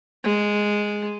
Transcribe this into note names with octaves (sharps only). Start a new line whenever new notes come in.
G#3